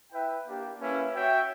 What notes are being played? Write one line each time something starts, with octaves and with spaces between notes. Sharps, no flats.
E4 B4 E5 G5
A#3 D4 G4
A#3 C#4 E4 B4
F#4 C#5 E5 G5